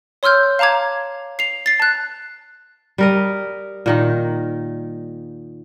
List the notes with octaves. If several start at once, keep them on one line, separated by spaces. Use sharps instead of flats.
C#5 C6 E6 F6 G6
F5 A5 A#5 D6 G#6
C7 F7
A6 C7
A5 F#6
G3 A#4 D#5
A#2 D#3 D#4